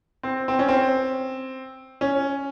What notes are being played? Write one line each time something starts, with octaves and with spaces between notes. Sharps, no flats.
C4
C4
C#4
C4
C#4